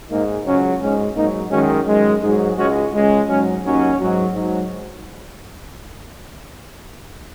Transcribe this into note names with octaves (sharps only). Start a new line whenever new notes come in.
G#2 G#3 A#3 D#4
C#2 C#3 F#3 C#4
G#2 G#3 C#4
G#2 F#3 A#3 D#4
F#2 D#3 G#3 C#4 F#4
F#2 D#3 G#3
G#2 F#3 D#4 G#4
C#2 C#3 G#3 C#4 F#4
C#2 C#3 G#3
G#2 F#3 C#4
D#2 D#3 F#3 C#4
G#2 F#3
G#2 F#3